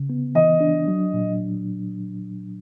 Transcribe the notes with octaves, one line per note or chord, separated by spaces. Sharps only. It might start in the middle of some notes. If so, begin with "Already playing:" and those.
Already playing: C#3
B3
E3 D#5
D4
F#3
A#2